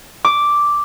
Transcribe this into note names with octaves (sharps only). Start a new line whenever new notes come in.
D6